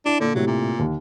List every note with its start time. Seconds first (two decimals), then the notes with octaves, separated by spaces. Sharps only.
0.06 D4 E4
0.21 A#2 D3
0.35 A2 C3 F#3
0.47 A#2
0.79 D#2